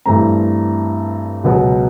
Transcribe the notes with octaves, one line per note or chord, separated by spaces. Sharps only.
G2 E3 A3 C4 A#5
C#2 B2 F#3 B3